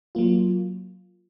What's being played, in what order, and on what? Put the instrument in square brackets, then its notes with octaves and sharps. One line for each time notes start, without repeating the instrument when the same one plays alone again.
[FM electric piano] F#3 A#3 F4